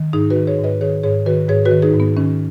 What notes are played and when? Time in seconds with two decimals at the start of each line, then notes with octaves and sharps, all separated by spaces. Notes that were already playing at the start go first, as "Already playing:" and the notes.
Already playing: D#3
0.13 G#2 D#4 G#4
0.30 F#4 B4
0.36 D#3
0.47 G#4 C#5
0.58 G#2
0.64 B4 D#5
0.81 D#3 G#4 C#5
1.03 G#2 G#4 C#5
1.26 D#3 F#4 B4
1.49 G#2 G#4 C#5
1.65 F#4 B4
1.71 D#3
1.82 D#4 G#4
1.94 G#2
2.00 B3
2.17 D#3 C#4